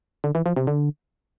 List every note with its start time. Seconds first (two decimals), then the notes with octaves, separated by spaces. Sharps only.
0.24 D3
0.35 E3
0.46 F3
0.56 C3
0.67 D3